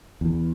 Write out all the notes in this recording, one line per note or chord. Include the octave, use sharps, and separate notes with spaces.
E2